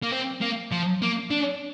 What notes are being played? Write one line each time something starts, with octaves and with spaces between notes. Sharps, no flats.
A#3
C4
A#3
F3
A#3
D4